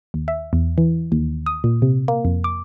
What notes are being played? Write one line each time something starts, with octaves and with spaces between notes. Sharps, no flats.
D#2
E5
E2
E3
D#2
D#6
A#2
C3
A#3
F2
D6